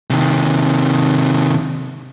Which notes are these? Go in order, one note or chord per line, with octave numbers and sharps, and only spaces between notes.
C3 D#3